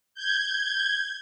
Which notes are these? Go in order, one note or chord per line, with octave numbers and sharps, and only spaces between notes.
G6 G#6